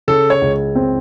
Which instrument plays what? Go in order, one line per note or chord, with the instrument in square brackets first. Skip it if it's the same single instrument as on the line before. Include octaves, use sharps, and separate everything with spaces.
[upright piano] C#3 [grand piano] A4
[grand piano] C#5
[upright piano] C#2
C4